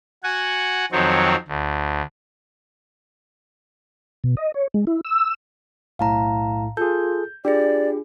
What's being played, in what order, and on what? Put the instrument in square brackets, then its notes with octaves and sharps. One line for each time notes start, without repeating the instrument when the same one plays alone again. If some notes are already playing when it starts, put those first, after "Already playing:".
[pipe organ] F#4 F#5 G#5
F2 D#3 F#3 C4 C#5
D2
[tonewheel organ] B2
D#5
C#5
G#3
E4
E6
[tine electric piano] B1 A2 [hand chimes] F5 A5 A#5
[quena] F4 [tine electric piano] G#4 A4 [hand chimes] G6
[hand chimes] D4 F4 G#4 [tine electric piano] G4 [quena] D5